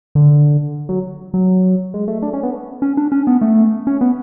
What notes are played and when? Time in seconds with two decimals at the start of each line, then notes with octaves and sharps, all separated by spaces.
0.15 D3
0.89 F#3
1.34 F#3
1.94 G#3
2.08 A3
2.22 D4
2.33 C#4
2.43 B3
2.82 C#4
2.97 D4
3.12 C#4
3.27 B3
3.41 A3
3.87 C#4
4.01 B3